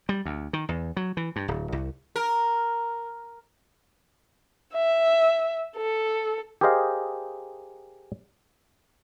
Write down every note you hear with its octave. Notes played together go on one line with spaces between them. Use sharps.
G3
D2
D#3
E2
F#3
E3
G2
D1
C2
A#4
E5
A4
G4 G#4 A#4 C5 D#5 F5